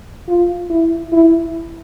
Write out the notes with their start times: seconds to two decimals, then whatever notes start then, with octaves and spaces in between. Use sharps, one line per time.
0.28 F4
0.70 E4
1.12 E4